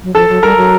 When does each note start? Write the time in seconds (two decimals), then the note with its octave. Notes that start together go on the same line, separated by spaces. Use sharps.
0.03 F#3
0.15 F3 A4 A5
0.29 F#3
0.43 G3 A#4 A#5
0.57 F#3